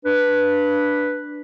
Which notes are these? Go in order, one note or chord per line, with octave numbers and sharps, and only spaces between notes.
D4 B4